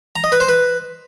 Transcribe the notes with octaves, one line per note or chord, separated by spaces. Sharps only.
A#5
D#5
B4
C5
B4